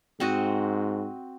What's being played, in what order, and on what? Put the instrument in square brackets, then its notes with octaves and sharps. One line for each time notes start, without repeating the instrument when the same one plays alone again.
[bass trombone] G#2 [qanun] C4 F#4 D#5